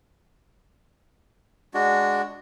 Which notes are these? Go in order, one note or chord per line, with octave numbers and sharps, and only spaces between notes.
G#3 D4 F#4